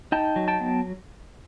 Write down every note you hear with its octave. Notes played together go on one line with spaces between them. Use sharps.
D#4 G5 A5
F#3
G5 A5
B3